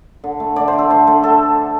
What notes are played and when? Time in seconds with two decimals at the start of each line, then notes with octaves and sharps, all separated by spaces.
0.24 D3
0.40 A3
0.56 D3 D5
0.68 C5
0.73 A3
0.79 A4
0.90 D3 C5
1.07 A3
1.23 D3 A4